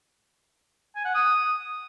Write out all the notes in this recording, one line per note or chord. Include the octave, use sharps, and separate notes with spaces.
G#5
F#5
D#6